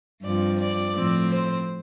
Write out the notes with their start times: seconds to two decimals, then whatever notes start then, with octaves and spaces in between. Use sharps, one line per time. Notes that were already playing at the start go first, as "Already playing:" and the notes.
0.24 G2 F3 C4 D5
0.59 D5
0.95 A2 F3 C4
1.31 C5